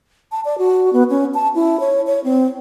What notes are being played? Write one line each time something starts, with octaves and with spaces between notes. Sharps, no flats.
A5
D5
F#4
B3
C#4
A5
E4
C#5
C#5
C4